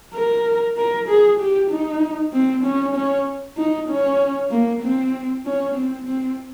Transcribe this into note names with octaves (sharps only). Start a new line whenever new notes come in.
A#4
A#4
G#4
G4
D#4
C4
C#4
C#4
D#4
C#4
A#3
C4
C#4
C4
C4